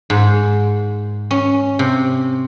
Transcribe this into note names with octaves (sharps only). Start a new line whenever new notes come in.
G#2
C#4
C3